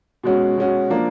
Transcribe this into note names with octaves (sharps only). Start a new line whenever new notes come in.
B2 G#3 C#4 F#4
B2 G#3 C#4 F#4
F3 A#3 D4